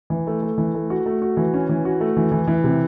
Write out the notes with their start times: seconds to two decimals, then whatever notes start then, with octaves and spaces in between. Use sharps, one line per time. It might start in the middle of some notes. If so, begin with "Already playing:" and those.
0.10 E3
0.27 A3
0.42 A3
0.58 E3
0.74 A3
0.90 F#4
1.06 A3
1.22 F#4
1.37 E3
1.54 C#4
1.69 E3
1.85 F#4
2.01 A3
2.17 E3
2.32 E3
2.47 E3
2.64 C3